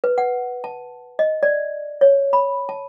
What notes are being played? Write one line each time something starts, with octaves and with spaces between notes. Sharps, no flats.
B4
F#5
A5
D#5
D5
C#5
B5
A5